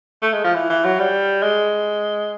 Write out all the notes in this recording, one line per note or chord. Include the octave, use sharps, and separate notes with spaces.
A3
G#3
F3
E3
E3
F#3
G3
G#3